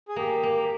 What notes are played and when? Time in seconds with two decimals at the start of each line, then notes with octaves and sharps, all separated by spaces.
0.08 G#4
0.16 A#3 G4
0.43 A#3